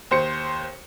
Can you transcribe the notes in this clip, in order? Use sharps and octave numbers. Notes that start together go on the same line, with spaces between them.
D#2 C5 C#7